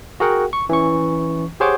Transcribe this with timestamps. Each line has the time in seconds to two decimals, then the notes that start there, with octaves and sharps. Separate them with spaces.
0.20 F#4 G#4 A#4 F#5 G5
0.53 C#6
0.69 E3 C#4 C#6
1.60 G4 G#4 C5 C#5 F#5 D6